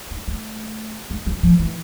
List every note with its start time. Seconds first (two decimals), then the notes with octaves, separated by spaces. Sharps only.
0.11 D4
0.28 A3
1.10 G#3
1.26 G3
1.43 F3
1.59 E3